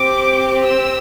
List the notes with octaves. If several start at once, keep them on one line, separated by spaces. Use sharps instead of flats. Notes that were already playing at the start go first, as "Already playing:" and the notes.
Already playing: C4 G4 D6
E6